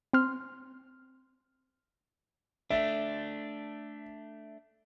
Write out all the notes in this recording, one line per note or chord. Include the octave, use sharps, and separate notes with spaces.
C4 C6 F6
A3 D4 E5